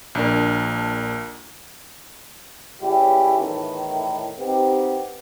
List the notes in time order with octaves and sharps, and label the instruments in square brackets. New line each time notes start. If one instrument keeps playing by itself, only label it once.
[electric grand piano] A#1 D4 A#4
[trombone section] C#2 C#3 G3 C#4 E4 G4
E2 A2 D#3
B3 C4 D#4 G4